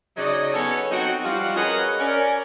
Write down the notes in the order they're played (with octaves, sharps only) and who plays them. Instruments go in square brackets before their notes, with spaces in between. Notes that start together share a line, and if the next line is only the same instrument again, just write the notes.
[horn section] C#3 F#3 D#4 D5 D#5
B3 C#4 A4 C#5
F#3 C4 D#4 F#4
F3 G3 F4 F#4
C#4 F#4 G#4 A#4 B4 D#5
C#4 A#4 D5